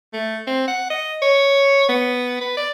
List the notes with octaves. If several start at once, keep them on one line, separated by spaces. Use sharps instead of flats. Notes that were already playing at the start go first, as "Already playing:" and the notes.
A3
C4
F#5
D#5
C#5
B3
B4
D5